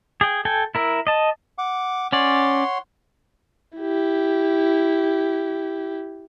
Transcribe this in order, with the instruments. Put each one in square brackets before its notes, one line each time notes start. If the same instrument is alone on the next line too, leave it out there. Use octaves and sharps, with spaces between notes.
[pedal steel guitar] G#4 G5
A4 G5 G#5
E4 A#4 E5
D#5 A5
[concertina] F#5 D6
[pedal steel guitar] C#4 D5 [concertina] C#5 F#5 C6
[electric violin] E4 G4